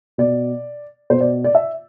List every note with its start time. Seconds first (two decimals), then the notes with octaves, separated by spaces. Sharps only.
0.18 B2 D5
1.10 B2 C5
1.21 D5
1.44 D5
1.55 E5